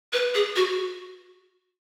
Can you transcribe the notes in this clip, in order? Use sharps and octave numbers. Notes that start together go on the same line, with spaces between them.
B4
G#4
F#4